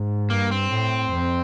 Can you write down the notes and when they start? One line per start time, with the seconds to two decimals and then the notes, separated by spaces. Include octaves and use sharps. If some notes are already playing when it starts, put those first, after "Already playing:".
Already playing: G#2
0.30 G2 A#3
0.51 C4
0.71 A2
1.12 F2